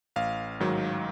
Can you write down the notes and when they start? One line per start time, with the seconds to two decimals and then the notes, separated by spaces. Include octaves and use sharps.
0.16 A1 F5
0.60 G#2 D#3 F#3